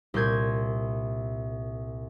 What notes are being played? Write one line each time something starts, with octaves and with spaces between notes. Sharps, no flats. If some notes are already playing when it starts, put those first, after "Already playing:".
C2 A#2 C6 G6 G#6